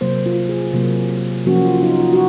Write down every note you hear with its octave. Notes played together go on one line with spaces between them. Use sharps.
C3 F#3 A#3 C5
F4
G#4
C3 F#3 A#3
F3 A#3 C#4 F#4
F4
F4
D#4
F4
F#4